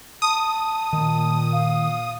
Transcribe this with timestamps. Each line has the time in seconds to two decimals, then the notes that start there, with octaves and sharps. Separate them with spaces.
0.22 A5 D#6
0.93 A#2 D#3
1.52 F5